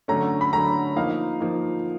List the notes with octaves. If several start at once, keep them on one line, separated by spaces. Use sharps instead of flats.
D3 F#3 A3 C#4 A#5
B5
D3 F#3 A3 C#4 A#5
F3 A#3 D#4 F5
F3 A#3 D#4